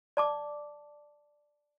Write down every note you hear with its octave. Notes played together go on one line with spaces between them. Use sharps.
D5 A5 D6